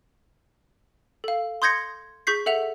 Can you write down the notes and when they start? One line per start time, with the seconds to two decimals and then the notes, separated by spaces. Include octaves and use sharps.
1.24 A4 F5
1.62 C6 D#6 G6 G#6 A#6 C#7
2.27 G#4 C#6 G6 B6 C7
2.46 A4 E5 F#5 F7